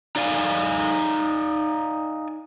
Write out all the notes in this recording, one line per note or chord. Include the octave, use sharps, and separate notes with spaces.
D#4 D5 F5 G#5